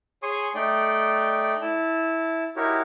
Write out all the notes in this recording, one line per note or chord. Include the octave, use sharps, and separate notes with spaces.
G#4 C#5 G#5 C6 C#6 D#6
A3 D#4 D5 G5
E4 A5
D#4 E4 F#4 G4 A#4 C#5